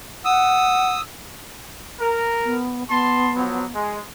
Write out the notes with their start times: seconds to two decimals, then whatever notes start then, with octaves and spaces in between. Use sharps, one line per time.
0.25 F#5 D#6 E6
2.00 A#4
2.45 B3
2.89 B3 A5 C6
3.36 F3 F#3
3.74 G#3